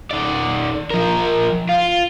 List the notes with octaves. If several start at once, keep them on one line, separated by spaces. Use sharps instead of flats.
D#3 D5
F3 A#4
F4